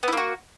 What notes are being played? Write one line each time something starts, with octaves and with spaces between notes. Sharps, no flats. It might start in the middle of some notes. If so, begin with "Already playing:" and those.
A#3 B3 E4 F#4